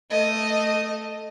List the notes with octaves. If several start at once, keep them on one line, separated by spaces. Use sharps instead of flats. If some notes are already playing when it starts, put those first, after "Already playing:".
A3 D#5